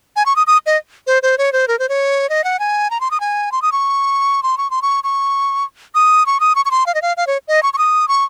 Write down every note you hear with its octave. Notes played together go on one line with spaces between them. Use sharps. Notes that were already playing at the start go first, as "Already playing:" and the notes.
G#5
C#6
D#6
D#6
D#5
C5
C5
C#5
C5
A#4
C5
C#5
D#5
F#5
G#5
A#5
C6
D#6
G#5
C6
D#6
C#6
C6
C#6
C6
C#6
C#6
D#6
C#6
D#6
C#6
C#6
C6
F5
D#5
F5
F5
C#5
D#5
C#6
C#6
D#6
C#6